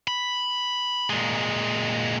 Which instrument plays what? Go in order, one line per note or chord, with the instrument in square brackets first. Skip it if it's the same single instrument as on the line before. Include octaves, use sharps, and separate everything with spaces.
[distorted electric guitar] B5
A#2 G#3